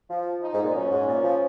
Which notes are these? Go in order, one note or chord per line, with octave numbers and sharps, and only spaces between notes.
F3
D#4
G#2
A#2
F#2 C#4
G#2
A#2
F3